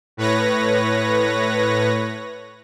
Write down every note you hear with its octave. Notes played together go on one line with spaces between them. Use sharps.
A2 B4 C#5 A#6